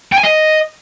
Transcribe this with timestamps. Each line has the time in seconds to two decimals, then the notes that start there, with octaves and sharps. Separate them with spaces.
0.12 G5
0.18 G#5
0.23 D#5